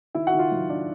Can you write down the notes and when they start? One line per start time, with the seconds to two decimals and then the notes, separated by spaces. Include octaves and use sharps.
0.15 D#3 E4 E5
0.27 F#4 F#5
0.33 D#3
0.39 F4 F5
0.52 F#3
0.70 D4